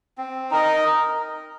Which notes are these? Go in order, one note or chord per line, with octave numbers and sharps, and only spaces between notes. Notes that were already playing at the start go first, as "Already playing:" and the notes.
C4
D#4 A#4 D#5